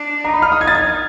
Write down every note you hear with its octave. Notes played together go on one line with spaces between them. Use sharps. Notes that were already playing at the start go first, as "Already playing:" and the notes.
Already playing: D4
D#4 A#5
B5
F6
D#6
G#6
A6
G#6